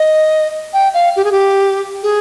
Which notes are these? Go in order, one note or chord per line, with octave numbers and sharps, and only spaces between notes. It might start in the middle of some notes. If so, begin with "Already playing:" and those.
Already playing: D#5
G5
F5
G4
G#4
G4
G#4